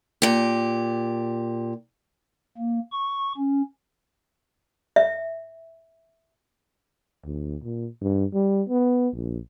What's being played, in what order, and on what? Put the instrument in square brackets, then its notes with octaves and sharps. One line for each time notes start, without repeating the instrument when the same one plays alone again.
[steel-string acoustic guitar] A#2 G4
[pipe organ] A#3
C#6
C#4
[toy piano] E5
[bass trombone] D2
A#2
G2
G3
B3
A#1